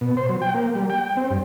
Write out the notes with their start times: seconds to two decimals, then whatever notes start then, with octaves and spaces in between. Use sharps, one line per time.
0.01 B2
0.17 C5
0.29 F#3
0.42 G5
0.55 A#3
0.75 G3
0.90 G5
1.03 G5
1.17 C4
1.31 G2